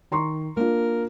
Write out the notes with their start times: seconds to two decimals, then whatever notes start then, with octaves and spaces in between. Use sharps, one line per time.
0.12 D#3 A#5 C6 C#6
0.57 A#3 D4 F4 A#4